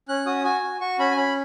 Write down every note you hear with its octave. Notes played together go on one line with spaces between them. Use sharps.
C#4 F#6
F#4 D#6
F#4 G#5
F#4
F#4 C#6
C#4 B5
G#5
C#4 B5